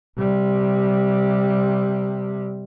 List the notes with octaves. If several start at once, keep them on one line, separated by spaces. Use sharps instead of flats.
C3 G3